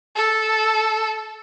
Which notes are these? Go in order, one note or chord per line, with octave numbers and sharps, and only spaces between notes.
A4